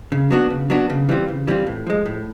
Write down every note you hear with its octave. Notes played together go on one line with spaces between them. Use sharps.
C#3
F#3 B3 D4 F#4
C#3
F#3 B3 D4 F#4
C#3
E3 G3 C4 F4
C#3
E3 G3 C4 F4
A2
F3 G#3
A2